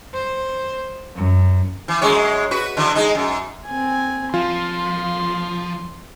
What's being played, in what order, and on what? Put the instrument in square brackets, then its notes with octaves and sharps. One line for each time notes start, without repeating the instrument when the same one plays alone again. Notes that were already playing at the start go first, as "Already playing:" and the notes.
[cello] C5
F#2
[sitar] E3
F#2 G#3 C#5
F#4 B4
D3 E3 F#3
G#3 D#4
F#2
[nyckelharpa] C4 G#5
[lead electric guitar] F3 [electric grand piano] F4 [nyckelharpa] C6